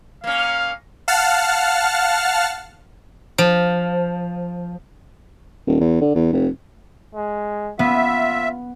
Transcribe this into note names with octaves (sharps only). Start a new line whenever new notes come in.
A#3 C#4 F5
F5 F#5 A5 F6
F3
D#1
E2
D3
E2
F1
G#3
B3 F4 E5